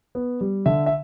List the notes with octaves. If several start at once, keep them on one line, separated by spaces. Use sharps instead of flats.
B3
G3
D3 E5
E5